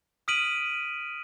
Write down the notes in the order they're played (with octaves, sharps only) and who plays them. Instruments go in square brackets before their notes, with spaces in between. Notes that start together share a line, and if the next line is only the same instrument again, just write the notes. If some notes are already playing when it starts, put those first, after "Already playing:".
[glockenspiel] D#6 F6 B6 D7 D#7 F#7